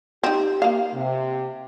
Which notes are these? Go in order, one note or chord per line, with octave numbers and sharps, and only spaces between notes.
C4 D#4 G4
A#3 F5
C3